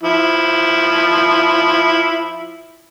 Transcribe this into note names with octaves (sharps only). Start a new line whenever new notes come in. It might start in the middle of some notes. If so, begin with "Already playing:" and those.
F3 E4